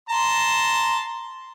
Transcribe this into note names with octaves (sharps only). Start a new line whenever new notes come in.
A5 A#5 C6